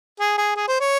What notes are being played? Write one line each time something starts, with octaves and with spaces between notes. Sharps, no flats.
G#4
G#4
G#4
C5
C#5